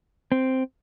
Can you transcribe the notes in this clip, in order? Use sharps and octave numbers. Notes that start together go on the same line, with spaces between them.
C4